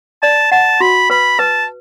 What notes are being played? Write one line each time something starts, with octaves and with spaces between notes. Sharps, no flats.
D5 A5
F#5 A5
F#4 B5
B4 B5
B4 A5